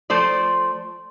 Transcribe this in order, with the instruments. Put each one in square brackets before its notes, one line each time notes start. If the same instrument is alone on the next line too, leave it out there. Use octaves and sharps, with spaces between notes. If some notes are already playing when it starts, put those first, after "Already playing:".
[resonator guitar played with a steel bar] F3 A3 C5 D5